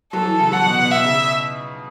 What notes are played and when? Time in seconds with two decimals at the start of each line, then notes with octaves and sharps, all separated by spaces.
0.13 F#3 A4
0.25 E3
0.39 C#3
0.52 F#3 F#5
0.65 B2
0.78 B2
0.91 B2 E5
1.04 C#3